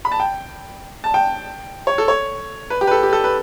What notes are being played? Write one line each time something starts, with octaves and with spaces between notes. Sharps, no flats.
B5
A5
G5
A5
G5
C#5
A4
C#5
B4
G4
B4
A4
G4
A4
B4